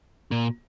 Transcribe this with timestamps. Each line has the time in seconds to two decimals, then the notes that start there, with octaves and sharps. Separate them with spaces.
0.31 A#2